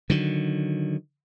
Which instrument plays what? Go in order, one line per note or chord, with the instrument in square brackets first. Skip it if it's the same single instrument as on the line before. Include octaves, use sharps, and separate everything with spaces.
[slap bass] D3 D#3 F#3